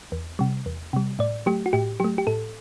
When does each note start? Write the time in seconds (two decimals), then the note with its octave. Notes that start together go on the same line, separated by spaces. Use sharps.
0.12 E2
0.39 C3 G3
0.66 E2
0.93 C3 G3
1.19 A2 D5
1.46 F#3 A3 G4
1.66 F#4
1.73 A2 G4
2.00 F#3 A3 G4
2.18 G4
2.27 A2 A4